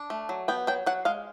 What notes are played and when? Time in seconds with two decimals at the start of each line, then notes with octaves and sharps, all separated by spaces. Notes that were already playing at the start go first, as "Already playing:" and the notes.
Already playing: D4
0.10 A3
0.29 F#3
0.48 B3 G5
0.67 F#3 G5
0.86 F#3 F#5
1.05 G#3 F5